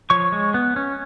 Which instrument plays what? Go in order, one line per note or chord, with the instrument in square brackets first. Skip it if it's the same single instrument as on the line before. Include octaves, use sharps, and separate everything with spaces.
[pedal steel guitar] F3 C#5 C#6
G#3
B3
C#4